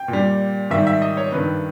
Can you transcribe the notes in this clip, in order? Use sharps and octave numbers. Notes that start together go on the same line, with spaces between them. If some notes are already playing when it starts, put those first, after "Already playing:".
Already playing: G5
A#2
G3
G#2 D#3 G3 E5
E5
D#5
C#5
G2 D#3 G3 B4